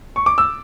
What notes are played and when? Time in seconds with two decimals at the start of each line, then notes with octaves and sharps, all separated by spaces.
0.16 C#6
0.26 D6
0.38 E6